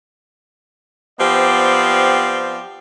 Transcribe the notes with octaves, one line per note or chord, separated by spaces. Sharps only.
F3 B3 C4 G4 D5